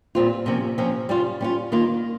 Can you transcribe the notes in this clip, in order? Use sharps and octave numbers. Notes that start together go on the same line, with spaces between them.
A#2 G3 C4 F4
C3 F3 A#3 C#4
C3 F3 A#3 C#4
G3 C#4 F4
G3 C#4 F4
D#3 A#3 F4